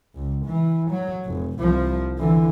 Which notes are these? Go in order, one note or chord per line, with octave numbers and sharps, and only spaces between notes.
C#2
E3
F#3
F1
C2 F3
D3 E3